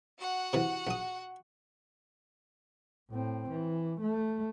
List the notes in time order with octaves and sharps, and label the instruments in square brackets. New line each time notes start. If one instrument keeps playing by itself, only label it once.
[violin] F#4 F#5
[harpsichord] C3 E3
A#1 D#6
[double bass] A2 C4
E3
A3